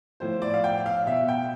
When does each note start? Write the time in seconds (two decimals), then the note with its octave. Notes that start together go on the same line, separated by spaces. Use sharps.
0.20 A2 F3 C5
0.42 D5
0.54 F5
0.64 G5
0.86 F5
1.06 B2 E5
1.28 G5